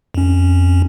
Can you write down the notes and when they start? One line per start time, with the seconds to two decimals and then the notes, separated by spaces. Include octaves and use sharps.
0.14 F2 C#4